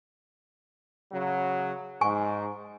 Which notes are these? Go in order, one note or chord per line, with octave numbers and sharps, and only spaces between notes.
C#3 F#3
G#2 G#5 C#6